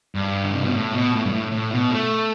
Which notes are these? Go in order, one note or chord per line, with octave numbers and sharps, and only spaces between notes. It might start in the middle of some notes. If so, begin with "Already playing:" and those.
G2
D3
C3
B2
A2
B2
A2
G2
A2
A2
B2
A3